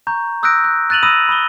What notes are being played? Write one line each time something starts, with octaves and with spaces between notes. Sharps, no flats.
A#5 C#6 G6
D#6 E6 F#6 G6 A#6 D7
F#6
F#6 A6 D#7 F7 F#7
B5 D#6 E6 A#6 D#7
B5 D#6 G7